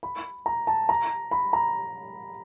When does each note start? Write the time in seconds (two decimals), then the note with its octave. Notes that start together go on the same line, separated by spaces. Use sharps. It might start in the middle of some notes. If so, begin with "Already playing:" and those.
0.03 B5
0.46 A#5
0.67 A5
0.89 A#5
1.31 B5
1.53 A#5